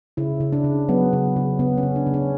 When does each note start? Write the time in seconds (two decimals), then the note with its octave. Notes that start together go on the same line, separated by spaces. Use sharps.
0.17 C#3 E4
0.40 C#3
0.53 D4
0.64 C#3
0.88 F#3 B3
1.13 C#3
1.36 C#3
1.59 C#3 B3
1.78 C#4
1.83 C#3
1.96 D4
2.07 C#3
2.14 C#4